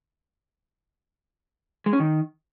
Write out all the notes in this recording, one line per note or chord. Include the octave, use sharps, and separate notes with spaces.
G#3
C#4
D#3